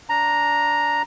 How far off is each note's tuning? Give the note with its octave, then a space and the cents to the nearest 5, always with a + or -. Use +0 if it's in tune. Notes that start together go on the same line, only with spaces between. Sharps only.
D4 -20 A#5 +0